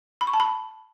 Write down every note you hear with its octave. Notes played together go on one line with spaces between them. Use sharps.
B5
C#6
A5
B5